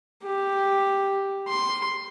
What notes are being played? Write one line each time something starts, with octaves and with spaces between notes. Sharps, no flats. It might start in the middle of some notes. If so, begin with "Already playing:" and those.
G4
C6